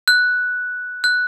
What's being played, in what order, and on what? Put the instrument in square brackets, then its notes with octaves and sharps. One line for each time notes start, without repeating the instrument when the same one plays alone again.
[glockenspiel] F#6
F#6